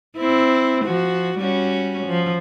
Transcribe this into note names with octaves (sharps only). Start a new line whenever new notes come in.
C4 E4
F3 F#4
G3 C#4 F#4
F3